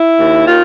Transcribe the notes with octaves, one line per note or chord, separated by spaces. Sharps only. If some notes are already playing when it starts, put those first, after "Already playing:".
Already playing: E4
D#2
D#3 F4